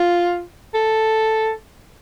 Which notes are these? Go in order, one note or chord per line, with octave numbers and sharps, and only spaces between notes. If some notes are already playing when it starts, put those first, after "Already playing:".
Already playing: F4
A4